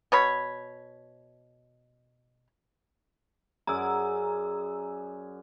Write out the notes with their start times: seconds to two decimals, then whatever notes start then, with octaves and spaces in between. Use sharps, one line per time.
0.12 B2 C#5 B5
3.67 F#2 G#4 D5 A#5 E6